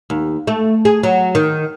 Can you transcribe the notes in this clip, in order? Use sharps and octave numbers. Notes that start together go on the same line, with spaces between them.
D#2
A3
G#4
F#3
D#3